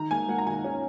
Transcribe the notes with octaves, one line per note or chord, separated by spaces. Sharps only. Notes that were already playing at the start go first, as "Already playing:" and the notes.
Already playing: D#3 A#5
A#3 G#5
A#3 F#5
A#5
D#3 G#5
C#4